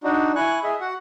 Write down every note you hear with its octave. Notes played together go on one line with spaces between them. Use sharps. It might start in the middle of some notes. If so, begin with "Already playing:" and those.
D4 D#4 F#4
E4 G#5 C#6 F#6
G#4 D#5 E5
F#4 F#5